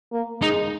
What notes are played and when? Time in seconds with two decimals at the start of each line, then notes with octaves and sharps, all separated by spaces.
0.12 A#3
0.42 G#3 D#4